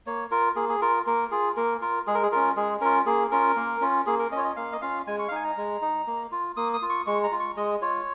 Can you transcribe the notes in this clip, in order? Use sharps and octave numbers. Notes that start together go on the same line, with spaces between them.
A#3 C#5
F4 A#4
A#3 G#4
G#4
F4 A#4
A#3 A#4
F4 G#4
A#3 A#4
F4 A#4
G#3 G#4
A#4
G#4
C#4 F4 A#4
G#3 G#4
C#4 F4 A#4
A#3 G#4
C#4 F4 A#4
A#3
C#4 F4
A#3 G#4
A#4
C#4 F4 C#5 D#5
D#5
A#3 F5
D#5
C#4 F4 F5
G#3 G#5
C#6
F5
D#4 G#5
A#5
G#3
D#4
A#3
F4
A#3 D#6
D#6
F4
C#6
G#3 C#6
A#5
F4
C#6
G#3 D#5
F4 C#5